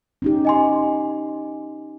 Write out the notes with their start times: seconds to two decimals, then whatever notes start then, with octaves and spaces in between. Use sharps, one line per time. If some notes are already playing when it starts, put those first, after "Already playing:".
0.22 C#4 D#4 G4
0.45 D#5 G#5 C6